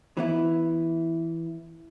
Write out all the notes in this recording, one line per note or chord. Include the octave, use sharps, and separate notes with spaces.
E3 B3 E4